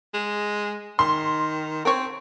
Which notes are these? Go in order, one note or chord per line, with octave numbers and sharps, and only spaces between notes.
G#3
D#3 C6
C4 A#4 C#5